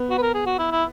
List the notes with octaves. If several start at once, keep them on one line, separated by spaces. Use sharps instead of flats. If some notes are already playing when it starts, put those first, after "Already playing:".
Already playing: B3
F#4
B4
A#4
G#4
F#4
E4
E4